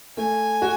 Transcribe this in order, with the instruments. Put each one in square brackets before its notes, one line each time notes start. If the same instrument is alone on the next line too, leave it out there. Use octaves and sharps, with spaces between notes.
[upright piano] A3 [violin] G#5
[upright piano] F#4